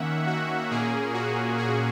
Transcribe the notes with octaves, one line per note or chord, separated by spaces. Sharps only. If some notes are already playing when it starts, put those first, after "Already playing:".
Already playing: D#3 A#3 C#4 E5 F#5
F#4
A#2 A#3 C#4 G#4
F#4
G#4